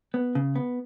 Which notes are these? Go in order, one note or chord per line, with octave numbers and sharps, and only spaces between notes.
B3
C#3
B3